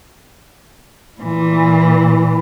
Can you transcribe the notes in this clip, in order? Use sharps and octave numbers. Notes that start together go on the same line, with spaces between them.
A#2 E3